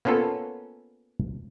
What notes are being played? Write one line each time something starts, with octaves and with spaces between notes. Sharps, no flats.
A#3 B3 C#4 F4 A4 B4